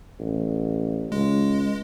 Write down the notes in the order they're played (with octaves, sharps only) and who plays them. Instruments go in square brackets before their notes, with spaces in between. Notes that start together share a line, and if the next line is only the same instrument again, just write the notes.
[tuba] A1
[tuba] C#2 [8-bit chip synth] G#3